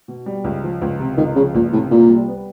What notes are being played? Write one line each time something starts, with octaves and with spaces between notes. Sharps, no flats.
B2
G3
C#2
F3
C#2
C3
C#2 D#3
C#3 F3
C#2 A#2
A2 C3
C2 A#2
G3
B3